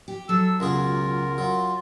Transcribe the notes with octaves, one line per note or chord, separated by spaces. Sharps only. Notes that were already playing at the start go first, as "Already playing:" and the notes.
G4
F#3 A4 E6
C#2 B2 F4 G#4 A#4
F#3 F4